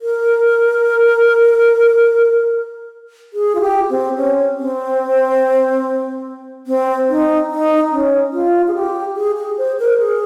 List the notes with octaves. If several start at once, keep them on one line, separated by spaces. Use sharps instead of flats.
A#4
G#4
F4
G4
C4
C#4
C4
C4
D#4
D#4
C#4
F4
G#4
G4
G#4
G#4
C5
A#4
G#4